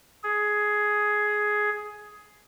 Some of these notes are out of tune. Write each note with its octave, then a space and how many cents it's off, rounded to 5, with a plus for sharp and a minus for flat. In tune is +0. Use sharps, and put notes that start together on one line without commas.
G#4 +10